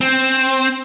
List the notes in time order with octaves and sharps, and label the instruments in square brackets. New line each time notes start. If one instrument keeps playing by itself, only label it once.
[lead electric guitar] C4